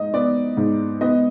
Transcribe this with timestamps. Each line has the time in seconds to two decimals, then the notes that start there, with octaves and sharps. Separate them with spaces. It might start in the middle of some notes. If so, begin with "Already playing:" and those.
Already playing: G#2 D#4 D#5
0.14 B3 D5
0.57 G#2
1.01 B3 D#5